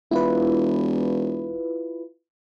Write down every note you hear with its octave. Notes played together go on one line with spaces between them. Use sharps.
E1 E4 F4 B4